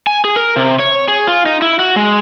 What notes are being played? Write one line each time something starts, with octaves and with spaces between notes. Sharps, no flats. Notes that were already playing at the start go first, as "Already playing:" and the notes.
G#5
G#4
A#4
C3
C#5
G#4
F4
D#4
E4
F#4
G#3